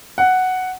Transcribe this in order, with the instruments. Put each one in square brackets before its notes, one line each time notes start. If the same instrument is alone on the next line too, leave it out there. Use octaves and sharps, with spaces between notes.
[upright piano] F#5